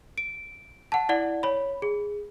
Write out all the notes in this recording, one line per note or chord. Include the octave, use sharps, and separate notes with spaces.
D7
F#5 A5
E4 D5 F#5
C#5 B5
G#4